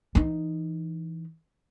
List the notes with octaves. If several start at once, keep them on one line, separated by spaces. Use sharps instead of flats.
E3 D#4